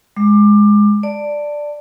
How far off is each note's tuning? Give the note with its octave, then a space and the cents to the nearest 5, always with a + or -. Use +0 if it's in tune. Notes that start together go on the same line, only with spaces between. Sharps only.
G#3 +0 D6 +20
D5 +0 A5 +20